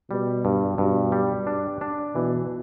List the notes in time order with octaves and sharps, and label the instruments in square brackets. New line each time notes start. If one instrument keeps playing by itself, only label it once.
[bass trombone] B2 [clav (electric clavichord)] G3
[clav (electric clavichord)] G2
[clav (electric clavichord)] G2 [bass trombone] B2
[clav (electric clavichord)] G3
D4
D4
[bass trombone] B2 [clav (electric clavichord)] E3